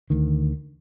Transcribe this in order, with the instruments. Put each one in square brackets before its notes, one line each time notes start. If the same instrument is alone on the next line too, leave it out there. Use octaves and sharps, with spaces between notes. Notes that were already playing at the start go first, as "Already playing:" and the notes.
[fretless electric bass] D2 D#3